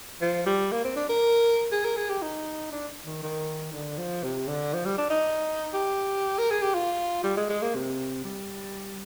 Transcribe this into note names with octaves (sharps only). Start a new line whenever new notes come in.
F3
G3
A#3
C4
D4
A#4
G#4
A#4
G#4
G4
D#4
D4
D#3
D#3
D3
F3
C3
D3
F3
G3
D4
D#4
G4
A#4
G#4
G4
F4
G3
G#3
G#3
A#3
C3
G3